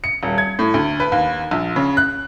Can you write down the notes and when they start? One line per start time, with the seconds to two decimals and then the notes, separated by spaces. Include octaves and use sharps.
0.04 C#7
0.23 D#1
0.38 G#6
0.59 A2
0.74 D2
1.00 B4
1.12 D#2
1.51 A#1
1.76 C#3
1.97 F#6